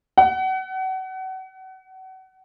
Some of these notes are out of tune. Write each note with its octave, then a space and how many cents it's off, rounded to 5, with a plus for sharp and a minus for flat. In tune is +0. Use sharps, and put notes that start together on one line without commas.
F#5 +30